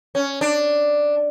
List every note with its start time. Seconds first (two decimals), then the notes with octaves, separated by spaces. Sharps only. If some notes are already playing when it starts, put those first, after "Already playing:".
0.15 C#4
0.41 D4